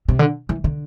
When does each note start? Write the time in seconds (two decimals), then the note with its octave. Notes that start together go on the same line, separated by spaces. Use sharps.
0.09 C3
0.19 D3
0.49 E3
0.64 D3